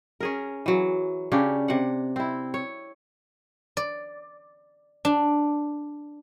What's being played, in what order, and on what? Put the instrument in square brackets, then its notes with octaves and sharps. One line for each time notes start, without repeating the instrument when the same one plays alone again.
[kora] C#4 G#4 A#4
E3 F#3
C#3 C#4 D4 G4
C3 F#5
C4 E4
C#5
[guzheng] D5
D4